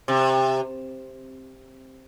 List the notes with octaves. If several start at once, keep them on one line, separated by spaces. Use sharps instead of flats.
C3